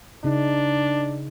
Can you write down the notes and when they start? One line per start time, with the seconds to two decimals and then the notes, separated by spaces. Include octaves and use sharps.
0.24 C#3 D4 D#4